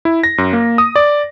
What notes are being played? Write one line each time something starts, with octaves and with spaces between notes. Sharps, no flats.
E4
A#6
F#2
A#3
D#6
D5